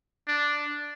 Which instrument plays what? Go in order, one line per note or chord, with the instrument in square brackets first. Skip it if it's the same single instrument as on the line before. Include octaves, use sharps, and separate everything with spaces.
[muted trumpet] D4